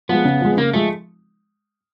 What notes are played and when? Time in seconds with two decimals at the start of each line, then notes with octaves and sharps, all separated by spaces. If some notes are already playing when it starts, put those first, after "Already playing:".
0.09 F3 G#3 B3
0.25 C#3
0.41 F3 G#3
0.57 C#3 A#3
0.73 F3 G#3 A3